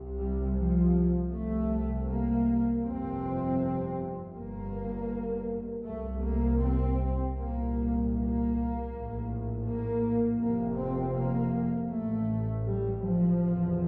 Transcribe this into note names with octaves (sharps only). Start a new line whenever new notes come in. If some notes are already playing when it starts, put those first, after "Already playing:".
Already playing: C2 C3
G3
F3
C2 C3 A3
A#3
G1 F2 C3 C4
G1 G2 A#3
C2 C3 A3
A#3
C4
C2 A#2 A#3
A#3
A#1 A2
A#3
F1 F2 C3 A#3
C4
A#3
A1 A2 A3
G3
F3
F1 E2 C3